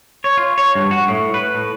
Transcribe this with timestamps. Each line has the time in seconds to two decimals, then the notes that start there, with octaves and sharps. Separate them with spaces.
0.24 C#5
0.37 F4
0.58 C#5
0.75 G2
0.91 F#4
1.08 A2
1.34 B4
1.55 A2